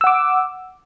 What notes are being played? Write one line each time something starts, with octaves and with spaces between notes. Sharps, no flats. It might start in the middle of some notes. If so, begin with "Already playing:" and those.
F#5 D6 E6